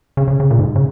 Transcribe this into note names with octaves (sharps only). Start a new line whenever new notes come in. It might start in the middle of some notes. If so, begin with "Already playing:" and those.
C#3
C#3
C#3
A#2
G#2
C#3